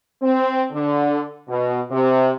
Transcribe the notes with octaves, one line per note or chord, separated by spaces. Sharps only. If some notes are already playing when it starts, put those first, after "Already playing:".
C4
D3
B2
C3